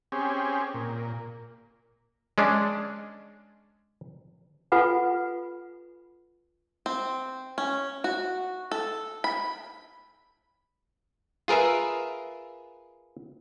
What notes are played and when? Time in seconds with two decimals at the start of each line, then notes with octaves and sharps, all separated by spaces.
0.12 C4 C#4 G4 G#4
0.74 A#2
2.38 G#3 C#4 D4
4.72 F4 A4 B4 F#5 G#5
6.86 C4
7.58 C#4
8.04 F#4
8.71 A4
9.24 B5
11.48 F4 G#4 A#4 B4 E5